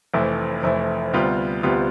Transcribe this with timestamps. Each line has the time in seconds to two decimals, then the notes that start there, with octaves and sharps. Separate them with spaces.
0.13 F1 F2 E3 A3 E4
0.63 F1 F2 E3 A3 E4
1.13 D2 C3 G3 B3 F4
1.63 D2 C3 G3 B3 F4